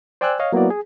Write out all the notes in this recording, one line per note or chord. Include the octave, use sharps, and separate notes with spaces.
C5 D5 G5 G#5 E6 F#6
C#5 D#5 F5
F#3 A#3 B3 E4 F#4 D5
G#4